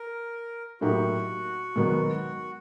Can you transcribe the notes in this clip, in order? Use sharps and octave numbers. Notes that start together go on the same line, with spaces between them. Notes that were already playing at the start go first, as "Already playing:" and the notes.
Already playing: A#4
A2 F#3 A#3 D#4 F#4 G4
G#2 D#3 F#3 B3